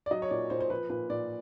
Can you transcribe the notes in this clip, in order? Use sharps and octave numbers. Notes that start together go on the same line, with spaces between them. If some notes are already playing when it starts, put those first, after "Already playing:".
D5
F#3 D#5
C#5
A#2 D5
A#2 C5
C5
F3 B4
A#2 B4
A#2 D5